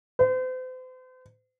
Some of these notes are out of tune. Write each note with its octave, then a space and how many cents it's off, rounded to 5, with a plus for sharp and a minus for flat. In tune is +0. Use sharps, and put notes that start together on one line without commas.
C5 -40